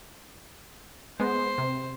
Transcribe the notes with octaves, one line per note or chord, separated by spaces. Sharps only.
G#3 B3 C5
C3